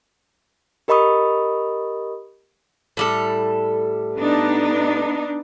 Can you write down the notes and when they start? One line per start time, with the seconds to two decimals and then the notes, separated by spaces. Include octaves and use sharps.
0.88 G4 A#4 D#5 B5 C#6 D#6
2.97 A2 G3 A4
4.16 B3 D4 D#4